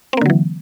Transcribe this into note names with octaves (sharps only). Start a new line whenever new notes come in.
D3 E3 F#3 A#3 C4